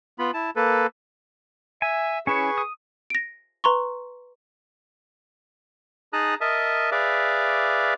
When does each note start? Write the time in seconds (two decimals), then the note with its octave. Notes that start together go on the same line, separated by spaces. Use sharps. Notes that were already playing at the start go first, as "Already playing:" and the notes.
0.19 B3 F4 B5
0.34 E4 A5
0.56 A#3 A4 B4
1.82 E5 G#5
2.27 C#4 E4 G#4 B4 C#5 C#6
2.58 D#6
3.10 A#6 D7
3.64 B4 A#5 C6 C#6
6.13 D#4 G#4 A5 A#5 D#6 F#6
6.41 A#4 D#5 E5 A5 D#6
6.92 G#4 B4 D5 E5 F5 D6